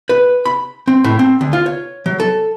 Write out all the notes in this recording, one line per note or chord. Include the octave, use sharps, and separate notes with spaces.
B4
B5
C4
A2
C4
D2
F4
C#5
F#3
A4